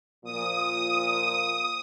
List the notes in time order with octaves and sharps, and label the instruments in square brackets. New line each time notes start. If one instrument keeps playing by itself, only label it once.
[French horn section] A#2 F3 [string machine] D#6